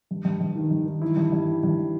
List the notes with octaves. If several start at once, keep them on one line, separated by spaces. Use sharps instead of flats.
G2
G2
G2
D#3
G2
D#3
E3 E4
G2
G2
E3
G2